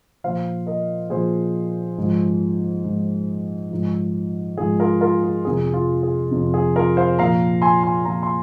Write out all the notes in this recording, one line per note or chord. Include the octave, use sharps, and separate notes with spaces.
A#2 F3 C5 F5
A#4 D#5
A#2 F3 G#4 C5
G#2 F3
G#2 F3
G#2 F3
G#2 F3 G#4
F4 A#4
F4 A#4
G#4
F2 C3 F3 G#4
F4
G#4
F2 C3 F3
G#4
F4 A#4
C5 F5
A#2 F3 F5 A#5
G#5 C6
G#5 C6
A#2 F3 F5 A#5
C6